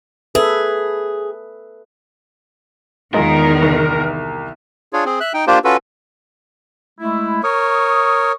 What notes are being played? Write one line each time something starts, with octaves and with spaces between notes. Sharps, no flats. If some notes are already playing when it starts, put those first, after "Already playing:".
G#4 A4 B4 E5
E2 D#3 G#3 F4 A#4
C2
D4 F4 G#4 C#5
C4 G#4
E5 F#6
D#4 G5
A#3 D4 F4 G4 C5
C#4 F4 F#4 A4 B4
G#3 A3 E4
A#4 C#5 C#6 D#6